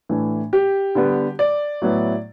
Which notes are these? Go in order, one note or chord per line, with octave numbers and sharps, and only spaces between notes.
A2 E3 A3 D4
G4
D3 G3 B3 D4
D5
A2 F#3 B3 E4